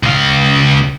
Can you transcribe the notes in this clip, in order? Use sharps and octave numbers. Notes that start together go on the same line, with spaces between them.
C#2 F5